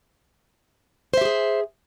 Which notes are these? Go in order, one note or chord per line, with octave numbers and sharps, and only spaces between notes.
G4 G#4 C5 E5